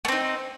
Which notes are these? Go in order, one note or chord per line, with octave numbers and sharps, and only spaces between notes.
A3 C4 D#4